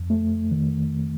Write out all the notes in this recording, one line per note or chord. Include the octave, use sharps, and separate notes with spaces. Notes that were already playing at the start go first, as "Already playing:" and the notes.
Already playing: F2
A3
D#3